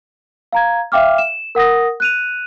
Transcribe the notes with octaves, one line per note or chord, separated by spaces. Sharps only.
F5 A#5 G#6
E5 F5 G5 D6 F6
E7
A#4 F#5 D#6 A#6
F#6 D#7 F7